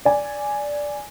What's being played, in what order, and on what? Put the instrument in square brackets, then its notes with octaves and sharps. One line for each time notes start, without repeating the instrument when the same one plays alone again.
[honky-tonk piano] D5 G#5